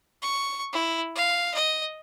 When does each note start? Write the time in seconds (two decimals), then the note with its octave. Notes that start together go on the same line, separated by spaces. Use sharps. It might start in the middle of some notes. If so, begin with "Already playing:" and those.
0.22 C#6
0.73 E4
1.16 F5
1.54 D#5